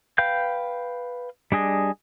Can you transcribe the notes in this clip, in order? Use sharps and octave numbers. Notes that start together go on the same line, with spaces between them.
B4 F5 G5 G6
G3 D4 G#4 D#5